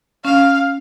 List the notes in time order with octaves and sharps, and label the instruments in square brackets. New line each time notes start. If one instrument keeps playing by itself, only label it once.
[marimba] C#4 [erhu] F5